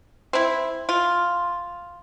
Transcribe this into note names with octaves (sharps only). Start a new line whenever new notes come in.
C4 E4
F4